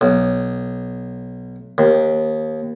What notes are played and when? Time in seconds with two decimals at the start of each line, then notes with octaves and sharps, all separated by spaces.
0.01 B1
1.78 D#2